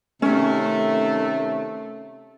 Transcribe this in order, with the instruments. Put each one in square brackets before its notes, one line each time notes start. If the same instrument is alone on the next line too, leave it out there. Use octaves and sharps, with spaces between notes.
[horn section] C3 D#3 A3 [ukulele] C#4